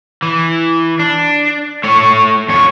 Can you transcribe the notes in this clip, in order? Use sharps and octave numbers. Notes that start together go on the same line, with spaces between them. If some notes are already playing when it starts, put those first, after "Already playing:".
E3
D4
A3 C#5
F2 C#5